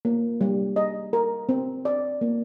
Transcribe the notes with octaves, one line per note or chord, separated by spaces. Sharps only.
A#3
G3
D#5
A#4
C4
D5
A#3